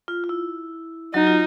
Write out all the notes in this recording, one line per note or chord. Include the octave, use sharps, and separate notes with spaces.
F4
F4
E4
F#3 D#4 F#4
F4